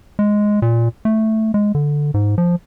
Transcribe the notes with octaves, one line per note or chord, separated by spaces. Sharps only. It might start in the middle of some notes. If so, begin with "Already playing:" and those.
G#3
A#2
A3
G#3
D3
G#2
F3